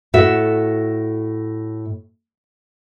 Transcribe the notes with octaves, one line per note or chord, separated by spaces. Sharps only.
A2 F#4 A4 E5